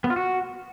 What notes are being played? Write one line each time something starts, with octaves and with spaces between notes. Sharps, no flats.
B3
F4
F#4